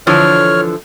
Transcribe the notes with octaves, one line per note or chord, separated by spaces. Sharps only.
D3 E3 F3 C#5 F6